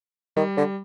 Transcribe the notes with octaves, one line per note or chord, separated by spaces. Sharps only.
D#3 G3
D3